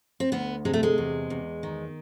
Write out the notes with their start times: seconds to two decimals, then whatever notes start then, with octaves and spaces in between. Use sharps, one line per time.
0.20 C4
0.32 D2 B3
0.65 C3 G#3
0.73 A3
0.83 G#3
0.98 E2
1.30 E2
1.63 D#3